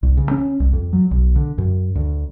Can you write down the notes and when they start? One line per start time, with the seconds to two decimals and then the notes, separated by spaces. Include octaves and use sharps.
0.03 C2
0.17 C#3
0.31 C#4
0.60 C2
0.73 F2
0.93 F#3
1.11 B1
1.36 D3
1.58 F#2
1.95 D2